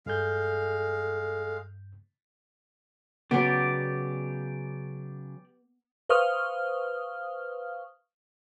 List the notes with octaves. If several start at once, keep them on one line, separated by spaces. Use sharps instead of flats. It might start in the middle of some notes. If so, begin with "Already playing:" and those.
G2 G#3 A4 F5 G6
C#3 F#3 B3 G4 D5
B4 C5 F5 C#6 D#6 F6